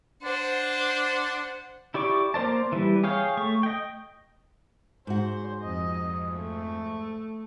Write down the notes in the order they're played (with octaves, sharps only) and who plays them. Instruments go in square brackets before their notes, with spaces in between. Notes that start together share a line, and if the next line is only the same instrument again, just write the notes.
[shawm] D4 [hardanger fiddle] C5 F#5
[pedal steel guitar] E4 G4 D5 C#6 D6
A#3 A#4 C5 D5 A5
E3 G3
G#4 C#5 F5 G5
A3 C#6
D#5 G5
[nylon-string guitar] G#2 F#4 [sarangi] C5
[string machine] F2 [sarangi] D#5
[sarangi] A3